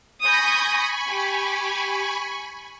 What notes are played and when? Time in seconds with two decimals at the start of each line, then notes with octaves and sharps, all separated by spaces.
0.21 G#5 B5 C#6 D#6 G6 A#6
1.09 G4